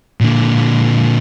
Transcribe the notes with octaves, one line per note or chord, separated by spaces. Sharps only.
A#2 D3